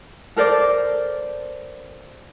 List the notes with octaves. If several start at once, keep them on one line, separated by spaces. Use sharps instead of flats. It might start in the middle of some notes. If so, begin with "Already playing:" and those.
A4 A#4 C5 D5